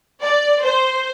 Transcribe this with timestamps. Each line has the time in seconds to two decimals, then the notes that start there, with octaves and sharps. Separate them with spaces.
0.22 D5
0.63 C5